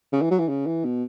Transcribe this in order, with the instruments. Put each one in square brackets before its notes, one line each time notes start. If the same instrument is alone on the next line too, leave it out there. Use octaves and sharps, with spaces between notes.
[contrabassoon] C#3
E3
F#3
E3
C#3
E3
B2